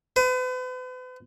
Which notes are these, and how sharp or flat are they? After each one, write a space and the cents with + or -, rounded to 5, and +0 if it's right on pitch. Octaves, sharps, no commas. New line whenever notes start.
B4 +40